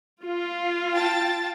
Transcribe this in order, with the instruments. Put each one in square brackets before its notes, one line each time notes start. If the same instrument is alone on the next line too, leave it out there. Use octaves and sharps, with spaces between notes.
[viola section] F4
[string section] G5 A5 A6